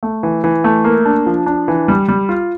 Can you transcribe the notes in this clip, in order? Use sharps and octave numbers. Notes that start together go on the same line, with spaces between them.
A3
E3
E3
A3
A#3
D4
F3
D4
E3
G3
G3
F4